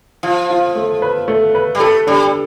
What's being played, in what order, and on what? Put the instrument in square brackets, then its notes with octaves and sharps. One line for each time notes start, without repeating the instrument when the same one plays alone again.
[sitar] F3 [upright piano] F4
[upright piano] F4
A3
B4
A3
B4
[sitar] G3
[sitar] A3 [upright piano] A4
[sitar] G3 [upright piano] D4